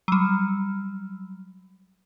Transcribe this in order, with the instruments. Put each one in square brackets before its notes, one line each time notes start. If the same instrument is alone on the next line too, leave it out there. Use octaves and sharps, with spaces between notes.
[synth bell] F#3 G3